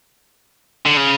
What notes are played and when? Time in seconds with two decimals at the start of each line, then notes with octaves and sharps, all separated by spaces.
0.85 D3
0.97 C#3